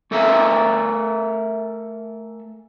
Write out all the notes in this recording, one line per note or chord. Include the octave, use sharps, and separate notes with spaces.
A3 A4 A#4 E5 F5 G#5